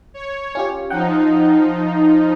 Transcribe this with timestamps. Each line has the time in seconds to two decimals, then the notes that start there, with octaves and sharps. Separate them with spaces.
0.14 C#5
0.55 C#4 F4 G4
0.90 F3 D#4 F#5 G5